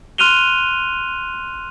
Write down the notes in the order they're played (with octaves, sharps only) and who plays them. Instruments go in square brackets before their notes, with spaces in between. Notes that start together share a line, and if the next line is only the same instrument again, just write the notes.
[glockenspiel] C6 F6 F#6 D#7 F7 G7